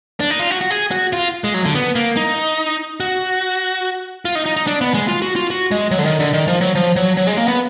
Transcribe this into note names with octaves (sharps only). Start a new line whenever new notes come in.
D4
D#4
F4
F#4
F#4
G#4
F#4
F4
G#3
F#3
D3
B3
A#3
D#4
F#4
F4
D#4
D#4
D#4
D4
B3
G#3
F4
F#4
F4
F#4
G#3
F#3
D3
D#3
D3
D#3
F3
F#3
F3
F#3
F#3
G#3
A#3
B3